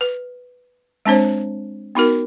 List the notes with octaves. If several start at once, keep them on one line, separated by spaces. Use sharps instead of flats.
B4
G#3 C4 D4 C5 C#5
B3 D#4 F#4 A#4